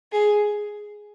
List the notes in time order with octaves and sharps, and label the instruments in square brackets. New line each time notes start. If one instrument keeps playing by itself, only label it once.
[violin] G#4